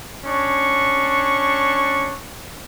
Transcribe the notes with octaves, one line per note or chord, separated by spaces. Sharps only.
C#4 D4 C#6